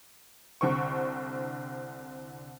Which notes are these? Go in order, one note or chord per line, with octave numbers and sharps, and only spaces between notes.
C2 D3 C4 C#6